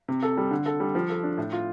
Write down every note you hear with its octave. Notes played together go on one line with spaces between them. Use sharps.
C3
A4
G3
D3
A4
G3
F3
A4
D4
A2
F4